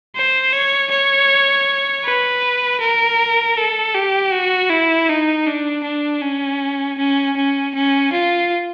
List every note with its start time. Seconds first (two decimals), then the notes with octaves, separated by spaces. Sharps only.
0.15 C5
0.53 C#5
0.91 C#5
2.05 B4
2.81 A#4
3.57 A4
3.95 G4
4.33 F#4
4.70 E4
5.09 D#4
5.47 D4
5.84 D4
6.22 C#4
6.98 C#4
7.37 C#4
7.75 C#4
8.13 F4